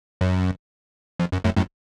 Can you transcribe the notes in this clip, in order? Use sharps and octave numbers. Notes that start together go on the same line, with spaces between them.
F#2
F2
F#2
F#2 A2
F#2 A2